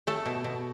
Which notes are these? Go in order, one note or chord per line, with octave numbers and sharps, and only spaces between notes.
A3 A4
B2
B2